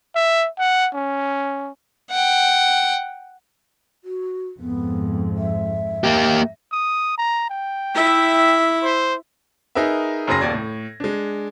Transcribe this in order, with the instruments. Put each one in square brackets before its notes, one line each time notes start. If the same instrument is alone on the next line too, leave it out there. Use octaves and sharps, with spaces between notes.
[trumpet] E5
F#5
C#4
[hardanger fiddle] F#5 G5
[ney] F#4
[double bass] F2 G#2 [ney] B3
[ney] E5
[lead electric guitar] A#3 G4
[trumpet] D#6
A#5
G5
[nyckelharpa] E4 E5
[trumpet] C5
[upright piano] D#4 G#4 A#4 B4 E5
F#1 F#2 G#4 C6 A#6
D#1 D#2 D5 G#6
A2
G#3 D4